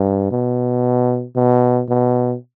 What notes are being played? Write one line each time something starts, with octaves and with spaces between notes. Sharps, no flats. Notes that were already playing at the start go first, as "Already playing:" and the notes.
Already playing: G2
B2
B2
B2